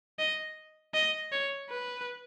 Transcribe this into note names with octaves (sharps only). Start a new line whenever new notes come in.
D#5
D#5
C#5
B4